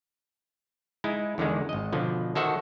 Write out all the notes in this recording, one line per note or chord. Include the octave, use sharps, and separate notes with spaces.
G#3 D#4 E4
E2 D3 D#3 G#3
G#1 D#5
B2 D3 F3
D#3 F#4 A4 C5 E5 F#5